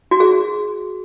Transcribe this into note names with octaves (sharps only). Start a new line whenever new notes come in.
F#4
G#4